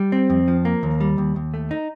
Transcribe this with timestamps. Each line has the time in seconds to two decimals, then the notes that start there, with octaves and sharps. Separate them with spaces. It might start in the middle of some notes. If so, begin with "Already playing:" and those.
Already playing: G3
0.12 C4
0.30 F2
0.48 F3
0.65 A#3
0.83 D#2
1.01 G3
1.18 D#2
1.36 D#2
1.54 A3
1.71 D#4